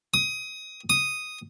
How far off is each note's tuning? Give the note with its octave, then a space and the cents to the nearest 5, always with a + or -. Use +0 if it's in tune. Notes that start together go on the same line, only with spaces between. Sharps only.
D#6 +20
D#6 +0